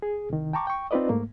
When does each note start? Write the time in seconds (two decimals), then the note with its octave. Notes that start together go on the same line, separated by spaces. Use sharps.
0.02 G#4
0.30 C2 D#3
0.53 G5 A5 A#5 C#6 D6
0.67 G5 C#6
0.91 C4 D#4 F4 B4 D5 D#5
1.09 G#2 A3 A#3